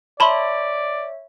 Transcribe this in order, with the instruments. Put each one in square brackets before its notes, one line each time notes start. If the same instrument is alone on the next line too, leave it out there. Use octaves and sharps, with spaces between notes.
[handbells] C#5 E5 [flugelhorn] D5 [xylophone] A5 B5 C6